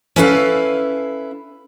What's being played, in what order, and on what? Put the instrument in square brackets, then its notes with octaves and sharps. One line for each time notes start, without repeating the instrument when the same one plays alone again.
[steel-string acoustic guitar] C#4 E4 A4 B4 D5 F5